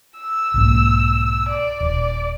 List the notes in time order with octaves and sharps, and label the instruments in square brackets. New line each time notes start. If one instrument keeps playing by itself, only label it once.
[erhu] E6
[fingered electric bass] B1 G#2 A#3
[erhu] D5
[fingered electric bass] D#1